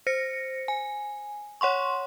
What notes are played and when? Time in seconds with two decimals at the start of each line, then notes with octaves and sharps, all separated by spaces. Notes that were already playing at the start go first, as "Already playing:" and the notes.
0.07 C5 A#6 C#7
0.68 G#5
1.61 C#5 F#5 C6 C#6